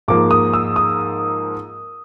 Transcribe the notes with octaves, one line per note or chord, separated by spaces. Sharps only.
G#2 F3 A#3 D6
D#6
E6
D#6